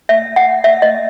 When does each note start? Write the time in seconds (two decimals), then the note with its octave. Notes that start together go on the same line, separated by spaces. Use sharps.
0.09 E5
0.36 F#5
0.64 E5
0.82 D#5